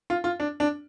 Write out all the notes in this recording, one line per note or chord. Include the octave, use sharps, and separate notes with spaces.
F4
F4
D4
D4